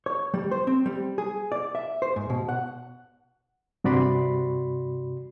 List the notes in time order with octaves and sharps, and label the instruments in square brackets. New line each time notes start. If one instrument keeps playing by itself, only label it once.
[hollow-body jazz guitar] C#5
G3
C5
C4
G3
G#4
D5
E5
C5
G#2
B2
F#5
[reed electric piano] G2 C3 F#4 D5 B5 C6